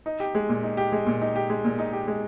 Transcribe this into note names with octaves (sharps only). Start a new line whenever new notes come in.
D#4
G4
G#3
A#2
D#4
G4
G#3
A#2
D#4
G4
G#3
A#2
D#4
G4
G#3